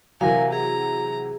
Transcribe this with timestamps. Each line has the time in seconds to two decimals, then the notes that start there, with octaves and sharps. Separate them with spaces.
0.21 C3 E3 F#3 A#4 F5 G#5
0.53 G#4 A#5